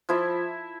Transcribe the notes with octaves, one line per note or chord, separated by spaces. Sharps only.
F3 E4 E5